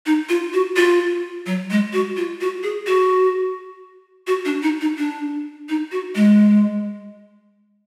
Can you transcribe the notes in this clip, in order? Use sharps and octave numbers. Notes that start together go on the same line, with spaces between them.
D#4
F4
F#4
F4
F#3
G#3
F#4
F4
F#4
G#4
F#4
F#4
D4
D#4
D#4
D4
D#4
F#4
G#3